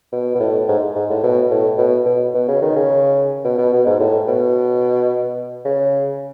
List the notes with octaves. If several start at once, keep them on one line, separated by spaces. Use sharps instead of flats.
B2
B2
A2
G#2
G#2
A2
B2
A2
B2
B2
B2
C#3
D#3
C#3
B2
B2
B2
G#2
A2
B2
C#3